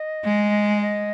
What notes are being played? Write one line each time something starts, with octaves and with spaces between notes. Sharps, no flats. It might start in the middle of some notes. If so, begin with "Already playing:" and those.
Already playing: D#5
G#3
D#5